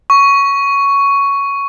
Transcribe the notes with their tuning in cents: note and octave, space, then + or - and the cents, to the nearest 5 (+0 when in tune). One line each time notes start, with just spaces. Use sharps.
C#6 +10